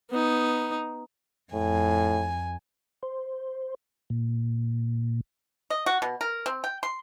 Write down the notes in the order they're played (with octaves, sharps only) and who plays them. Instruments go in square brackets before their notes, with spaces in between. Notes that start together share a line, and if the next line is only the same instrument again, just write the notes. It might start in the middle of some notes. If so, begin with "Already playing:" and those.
[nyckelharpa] B3 D#4
[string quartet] F2 G#5 [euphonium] A2
[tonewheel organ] C5
A#2
[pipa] D#5
F#4
B2
A#4
C4
G5
C6